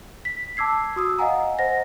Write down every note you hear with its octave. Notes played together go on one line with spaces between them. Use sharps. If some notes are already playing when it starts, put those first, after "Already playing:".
B6
A5 D6 E6 G#6 C7
F#4 D#6 E6
D#5 F5 F#5 G#5 A#5
C5 D#5 F#5 A#6